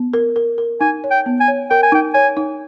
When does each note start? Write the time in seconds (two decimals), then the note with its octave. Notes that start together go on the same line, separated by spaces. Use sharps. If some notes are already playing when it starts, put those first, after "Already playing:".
Already playing: B3
0.14 A#4
0.36 A#4
0.58 A#4
0.81 D#4 G#5
1.04 C#5
1.11 G5
1.26 B3
1.40 G#5
1.48 C#5
1.70 A#4 G5
1.83 G#5
1.92 D#4 G5
2.14 C#5 G#5
2.37 D#4